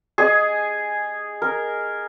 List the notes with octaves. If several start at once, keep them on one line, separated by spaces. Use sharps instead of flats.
G#4 D#5
A#4